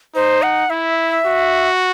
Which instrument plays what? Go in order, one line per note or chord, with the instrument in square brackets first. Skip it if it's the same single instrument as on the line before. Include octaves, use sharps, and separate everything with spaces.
[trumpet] D#4 [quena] C5
[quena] F#5
[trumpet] E4 [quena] E5
[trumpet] F#4